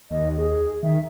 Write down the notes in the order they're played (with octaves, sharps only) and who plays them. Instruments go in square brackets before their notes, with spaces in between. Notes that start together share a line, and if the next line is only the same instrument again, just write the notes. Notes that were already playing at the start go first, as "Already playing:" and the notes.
[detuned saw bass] D#2 [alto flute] D#5
[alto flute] G#4
[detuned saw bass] D#3 [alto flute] E5